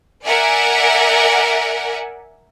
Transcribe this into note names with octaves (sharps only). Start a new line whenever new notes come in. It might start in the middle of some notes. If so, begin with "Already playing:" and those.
A#4 D5 E5 F#5 G#5